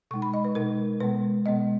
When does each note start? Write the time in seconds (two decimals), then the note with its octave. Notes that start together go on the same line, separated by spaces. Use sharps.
0.11 B2 G#3 D#4 C#6
0.22 B5
0.34 D#5
0.45 B4
0.55 B2 G#3 D#4 A#4
1.00 B2 G#3 B3 B4
1.46 B2 G#3 B3 D#5